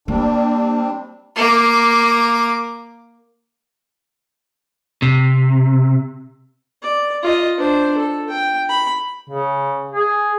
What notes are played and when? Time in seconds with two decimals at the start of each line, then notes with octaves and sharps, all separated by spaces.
0.08 G3 A#3 C4 D4
1.35 A#3 D6
5.02 C3
6.82 D5
7.23 F4 D#5
7.58 D4 C5
7.98 A4
8.30 G5
8.69 B5
9.29 C#3
9.91 G#4